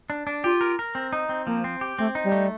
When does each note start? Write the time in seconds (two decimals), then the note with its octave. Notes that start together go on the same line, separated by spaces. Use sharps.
0.10 D4
0.27 D4
0.44 F4 G4
0.61 A#4
0.79 A#4
0.95 C4
1.13 D#4
1.29 C4
1.46 F3 A#3
1.64 C4
1.81 G4
1.99 A3 C4
2.15 D#4
2.24 G3
2.32 A3